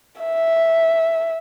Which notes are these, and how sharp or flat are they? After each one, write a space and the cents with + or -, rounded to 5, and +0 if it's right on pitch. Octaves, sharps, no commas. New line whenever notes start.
E5 -5